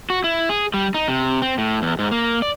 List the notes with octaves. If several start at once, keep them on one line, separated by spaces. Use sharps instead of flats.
F#4
E4
G#4
G3
D#4
C3
C4
A2
E2
G#2
A#3
D5